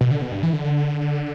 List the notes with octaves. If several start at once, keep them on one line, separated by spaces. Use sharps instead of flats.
B2
D3
B2
G2
E3
D3